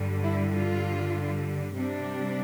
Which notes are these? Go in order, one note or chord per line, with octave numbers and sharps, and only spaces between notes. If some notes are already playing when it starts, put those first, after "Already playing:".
Already playing: G2 D3 G3
E4
F4
C3 G3 D4